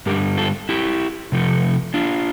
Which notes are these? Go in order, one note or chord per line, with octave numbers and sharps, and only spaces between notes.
G2 D3 G3 G4 A#4
F4 A4
E4 G4
C3 F3 A3
D4 F4